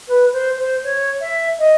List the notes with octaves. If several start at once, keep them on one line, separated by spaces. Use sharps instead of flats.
B4
C5
C5
C#5
E5
D#5